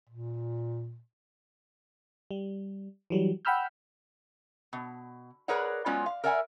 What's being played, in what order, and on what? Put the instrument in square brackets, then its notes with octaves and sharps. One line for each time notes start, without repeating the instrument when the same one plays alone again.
[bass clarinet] A#2
[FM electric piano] G3
E3 F#3 G3
F#5 G5 B5 E6 F6 G6
[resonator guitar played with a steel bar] B2
G#4 A#4 B4 C#5 D5 F#5
F#3 G#3 B3 C#4 F4 D5
F5
A#4 D5 E5 F#5 G#5